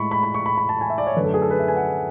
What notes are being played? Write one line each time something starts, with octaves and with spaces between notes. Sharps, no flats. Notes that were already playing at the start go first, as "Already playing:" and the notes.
Already playing: A2 G#3 B5 C#6
B5
B5
C#6
B5
B5
A5
G#5
E5
D5
C#5
F#2 D3 A3 B4
A4
G#4
A4
B4
E5
G#5
F#5